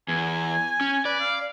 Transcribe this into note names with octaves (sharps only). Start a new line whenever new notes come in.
E2 G#5
C#4
B4 D5
F5